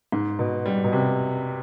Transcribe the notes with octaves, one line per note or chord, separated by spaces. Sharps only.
G#2
B2
G3
B2
C3